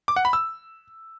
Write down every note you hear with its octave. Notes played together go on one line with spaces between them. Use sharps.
D6
F#5
B5
E6